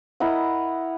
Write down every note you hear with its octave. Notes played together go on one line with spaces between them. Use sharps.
E4 A#4 D#5 F#5